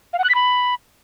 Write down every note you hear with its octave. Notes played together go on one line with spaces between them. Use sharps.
F5
F#5
F#6
B6
B5